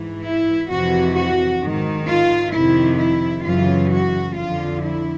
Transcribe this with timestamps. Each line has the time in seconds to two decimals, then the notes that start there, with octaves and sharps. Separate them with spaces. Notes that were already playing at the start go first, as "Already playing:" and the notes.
Already playing: G#2 E3
0.24 E4
0.69 F2 C3 E3 F#4
1.15 F#4
1.61 G#2 D#3
2.07 F4
2.52 F2 C3 D#3 E4
2.98 E4
3.43 F#2 C#3 E3 F4
3.90 F#4
4.35 F2 D3 F4
4.82 E4